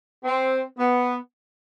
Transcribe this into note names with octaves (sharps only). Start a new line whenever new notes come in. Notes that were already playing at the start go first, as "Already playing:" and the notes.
C4
B3